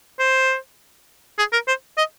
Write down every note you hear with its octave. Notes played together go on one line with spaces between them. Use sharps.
C5
G#4
A#4
C5
D#5